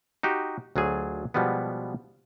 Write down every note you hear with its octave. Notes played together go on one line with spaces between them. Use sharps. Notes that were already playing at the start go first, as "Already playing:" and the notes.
D#4 F#4 G4
D2 F#3 F4 G#4
B2 F3 G3 G#3 B3